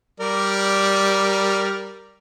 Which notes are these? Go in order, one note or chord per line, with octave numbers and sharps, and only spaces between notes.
G3 A#4 D5